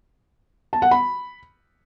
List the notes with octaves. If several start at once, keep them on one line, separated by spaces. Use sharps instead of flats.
A5
F#5
B5